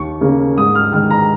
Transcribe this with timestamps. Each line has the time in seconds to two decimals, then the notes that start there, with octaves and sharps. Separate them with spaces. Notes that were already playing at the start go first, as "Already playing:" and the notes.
Already playing: D#2 C#6
0.21 C#3 A#3 C#4
0.57 G#2 D#6
0.75 F6
0.92 D#3 G#3 F6
1.11 A#5